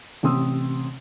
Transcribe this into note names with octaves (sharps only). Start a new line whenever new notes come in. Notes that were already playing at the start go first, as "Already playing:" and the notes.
A1 C3 C4 C6 D#6 E6